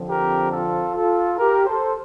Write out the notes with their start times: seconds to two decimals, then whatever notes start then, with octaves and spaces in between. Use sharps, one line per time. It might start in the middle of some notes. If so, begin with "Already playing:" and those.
Already playing: F2 D3 F3 C4
0.09 G4 A#4
0.51 F4 A4
0.95 F4 A4
1.38 G4 A#4
1.66 A4 C5